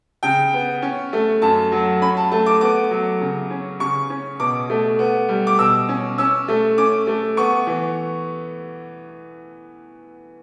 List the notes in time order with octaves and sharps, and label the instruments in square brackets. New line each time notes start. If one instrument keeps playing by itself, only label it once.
[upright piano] C#3 G5
B3
C#4
A3
F#2 A5
F#3
C#4 B5
A5
A3 A5
D6
B3 D6
F#3
C#3
C#4
C#3 C#6
C#4
B2 D6
A3
B3
G3
D6
B2 E6
C#4
C#4 E6
A3
C#4 D6
A3
B3 C#6
E3